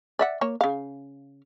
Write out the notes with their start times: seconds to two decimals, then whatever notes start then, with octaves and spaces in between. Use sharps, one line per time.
0.19 D5 E5 F#5
0.41 A#3 C#5
0.61 C#3 F5